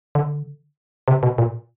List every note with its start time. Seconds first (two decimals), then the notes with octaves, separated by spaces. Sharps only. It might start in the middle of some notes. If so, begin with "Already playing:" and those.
0.15 D3
1.08 C3
1.23 B2
1.38 A#2